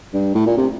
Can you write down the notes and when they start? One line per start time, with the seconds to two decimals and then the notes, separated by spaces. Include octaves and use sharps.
0.14 G2
0.35 A2
0.46 A#2
0.57 C3